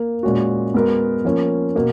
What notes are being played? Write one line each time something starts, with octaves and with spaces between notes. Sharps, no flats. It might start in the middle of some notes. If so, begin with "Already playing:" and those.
Already playing: A#3
A#2 G#3 C#4 F#4
G#3 B3 F#4 A#4
F3 A#3 C#4
B2 A#3